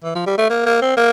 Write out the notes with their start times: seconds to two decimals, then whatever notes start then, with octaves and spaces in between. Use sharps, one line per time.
0.04 E3
0.15 F3
0.26 G3
0.38 A3
0.50 A#3
0.66 A#3
0.82 C4
0.97 A#3